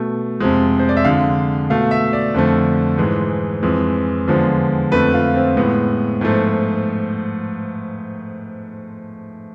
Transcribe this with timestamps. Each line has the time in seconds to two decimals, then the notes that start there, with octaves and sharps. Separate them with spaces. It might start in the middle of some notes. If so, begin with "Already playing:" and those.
Already playing: B2 A3
0.40 F2 C3 F3 G#3
0.80 C5
0.89 D5
0.97 E5
1.04 F2 D3 G#3 F5
1.70 B2 A3 F5
1.91 E5
2.13 D5
2.34 F2 D3 F3 A3
2.98 G#2 E3 G#3
3.63 F2 E3 G#3
4.28 E2 D3 F3 G#3
4.92 F2 D3 A3 B4
5.13 F4
5.35 C4
5.57 A2 G#3 B3
6.21 G#2 F3 A3